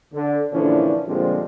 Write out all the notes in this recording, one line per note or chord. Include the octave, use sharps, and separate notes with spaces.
D3
A#2 D3 E3 F3 C#4 D4
A#2 D3 F3 G3 G#3 C4